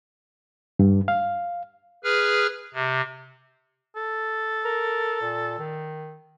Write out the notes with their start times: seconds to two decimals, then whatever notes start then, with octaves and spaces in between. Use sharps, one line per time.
0.79 G2
1.08 F5
2.04 G#4 B4 F6
2.74 C3
3.96 A4
4.65 A#4
5.21 A#2
5.58 D#3